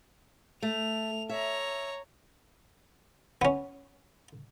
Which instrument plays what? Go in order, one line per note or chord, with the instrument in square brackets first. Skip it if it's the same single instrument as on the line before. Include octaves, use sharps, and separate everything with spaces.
[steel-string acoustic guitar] A3 [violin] F7
[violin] C#5 A#5 [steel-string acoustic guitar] E5
[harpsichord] B3 C#4